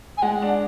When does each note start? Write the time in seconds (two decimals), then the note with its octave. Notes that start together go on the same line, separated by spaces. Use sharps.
0.18 G#5
0.22 G#3 F#5
0.42 D4